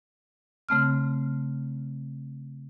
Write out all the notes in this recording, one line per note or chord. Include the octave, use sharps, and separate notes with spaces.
C#3 A3 C4 F6